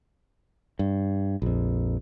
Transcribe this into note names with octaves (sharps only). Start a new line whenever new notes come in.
G2
A#1 F2